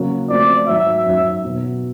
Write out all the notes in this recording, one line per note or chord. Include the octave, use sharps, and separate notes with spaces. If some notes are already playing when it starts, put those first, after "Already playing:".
Already playing: C#3 F#3 A#3 C#4
F3 A3 C4 D5
G#2 D#3 F#3 E5
F#2 D#3 F#3
B2 F#3 B3